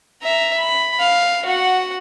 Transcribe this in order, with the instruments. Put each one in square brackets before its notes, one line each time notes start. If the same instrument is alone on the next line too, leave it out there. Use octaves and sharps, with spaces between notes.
[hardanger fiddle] E5 A#5
B5
F5
F#4 F#5